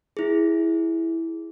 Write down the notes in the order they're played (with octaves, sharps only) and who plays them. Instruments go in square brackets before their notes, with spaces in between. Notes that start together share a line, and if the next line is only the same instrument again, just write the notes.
[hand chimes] E4 G#4